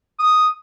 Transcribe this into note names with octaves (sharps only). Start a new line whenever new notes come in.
D#6